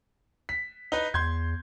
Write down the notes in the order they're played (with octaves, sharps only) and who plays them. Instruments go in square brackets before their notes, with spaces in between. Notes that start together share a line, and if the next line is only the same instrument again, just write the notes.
[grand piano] B6
D#4 B4
[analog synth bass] E2 [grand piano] C6 G6 G#6